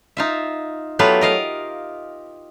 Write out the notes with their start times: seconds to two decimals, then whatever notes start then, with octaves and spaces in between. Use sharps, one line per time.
0.17 D#4 F4 E5
0.99 F#3 A3 B3 F4 G4 B4
1.21 A#4 D#5 F5